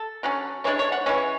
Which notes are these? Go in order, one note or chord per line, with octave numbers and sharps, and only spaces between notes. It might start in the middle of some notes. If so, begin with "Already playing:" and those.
Already playing: A4
D3 F#3 C#4
E3 G#3 D4 C#5
C#5
F#5
E3 G#3 C#4 C#5